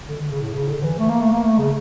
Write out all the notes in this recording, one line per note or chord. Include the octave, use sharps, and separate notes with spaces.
D3
C#3
A2
C#3
D3
E3
A3
A#3
A3
A#3
A3
C#3